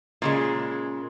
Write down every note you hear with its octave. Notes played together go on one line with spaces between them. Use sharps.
A#2 C#3 G#3